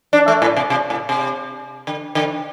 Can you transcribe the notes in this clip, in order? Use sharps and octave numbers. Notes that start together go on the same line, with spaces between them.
D4
A3
A2
C3
C3
A2
C3
D3
D3